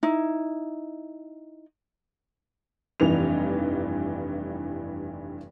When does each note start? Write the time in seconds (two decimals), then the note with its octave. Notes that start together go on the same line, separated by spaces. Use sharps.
0.03 D#4 E4
3.00 F1 G2 E3 D#4 F7